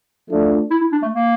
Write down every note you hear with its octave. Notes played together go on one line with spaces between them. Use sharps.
F3 A3 D4
E4
E4
D4
A3
A#3